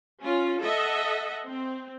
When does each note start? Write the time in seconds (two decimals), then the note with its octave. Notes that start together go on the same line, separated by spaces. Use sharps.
0.21 C#4 F4
0.61 A4 D#5 E5 F#5
1.45 C4